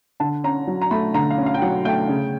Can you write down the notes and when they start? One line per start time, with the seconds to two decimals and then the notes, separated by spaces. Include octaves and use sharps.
0.20 D3 A5
0.44 C#4 A#5
0.67 F#3
0.82 A#5
0.91 A3 B5
1.14 D3 A#5
1.30 F5
1.38 C#4
1.46 F5
1.54 G5
1.62 F#3 F#5
1.85 A3 G5
2.09 C#3